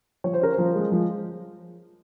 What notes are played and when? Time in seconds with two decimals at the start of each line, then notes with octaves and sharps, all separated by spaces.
0.24 F3 C#5
0.33 C5
0.41 C#4 A#4
0.52 C5
0.58 F3
0.75 G#3
0.92 F3